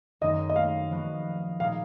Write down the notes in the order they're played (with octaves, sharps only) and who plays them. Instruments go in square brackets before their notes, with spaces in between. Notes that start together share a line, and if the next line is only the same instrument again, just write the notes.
[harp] F#2 D#3 G#3 D#4 [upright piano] D#5
[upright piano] D#5
F5
[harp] F3 B3 F#4
[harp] A#2 G#3 D#4 [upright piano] F5